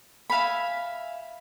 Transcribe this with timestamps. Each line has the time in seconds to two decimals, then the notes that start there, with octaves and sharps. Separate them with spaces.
0.30 E5 F5 G#5 B5